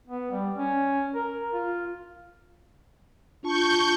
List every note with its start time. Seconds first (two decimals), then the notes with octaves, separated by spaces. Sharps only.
0.07 B3
0.31 G3
0.57 C#4
1.15 A#4
1.53 F4
3.43 D4 F4 A5 C#6 G6